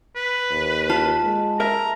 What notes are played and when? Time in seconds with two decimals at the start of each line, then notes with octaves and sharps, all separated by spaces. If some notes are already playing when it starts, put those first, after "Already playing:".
0.16 B4
0.51 D#2
0.90 F4 A5
1.23 G#3
1.60 A#4 E5 A#5